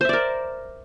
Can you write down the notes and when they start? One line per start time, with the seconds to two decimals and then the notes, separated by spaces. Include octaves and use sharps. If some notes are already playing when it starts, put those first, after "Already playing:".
0.01 C5
0.05 E5
0.09 D5
0.13 A#4